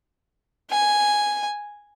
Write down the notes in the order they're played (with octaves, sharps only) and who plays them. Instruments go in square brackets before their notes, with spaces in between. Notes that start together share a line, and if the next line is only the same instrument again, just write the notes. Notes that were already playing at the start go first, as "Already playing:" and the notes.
[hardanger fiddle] G#5